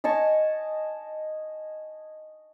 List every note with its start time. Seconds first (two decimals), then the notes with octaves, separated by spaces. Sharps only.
0.04 D#5 G#5 A5 C#6